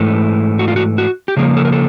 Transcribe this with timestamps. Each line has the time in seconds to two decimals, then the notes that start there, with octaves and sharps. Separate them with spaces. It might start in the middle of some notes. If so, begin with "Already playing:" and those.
Already playing: G#2 E3 A3
0.59 F#4
0.68 F4
0.76 F#4
0.98 F#4
1.28 G4
1.37 C#3 F3 A#3 G#4
1.57 A4
1.65 A#4
1.72 A4